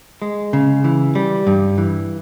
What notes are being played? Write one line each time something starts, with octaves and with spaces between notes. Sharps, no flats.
G#3
C#3
E3
G3
G2
E3